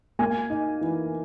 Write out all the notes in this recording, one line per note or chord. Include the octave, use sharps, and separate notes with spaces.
A#3 G#5
D#4
E3